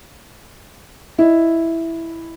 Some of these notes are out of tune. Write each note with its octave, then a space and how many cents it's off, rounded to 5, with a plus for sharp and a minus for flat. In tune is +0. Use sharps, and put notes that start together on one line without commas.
E4 +0 D#5 +0